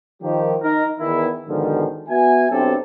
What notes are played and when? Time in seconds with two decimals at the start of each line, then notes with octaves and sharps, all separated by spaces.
0.22 D#3 F3 G4
0.62 D#4 A#4
1.00 E2 D#3 E4
1.48 G#2 B2 D3 D#3 F3
2.09 B3 F#4 E5 G#5
2.51 B1 F#3 C4 D4 G4 A4